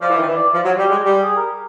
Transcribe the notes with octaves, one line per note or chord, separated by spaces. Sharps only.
F3 D5
E3
D#3
E3
D5
F3
F#3
G3 G4
G#3
G3 G4
G#4
A#4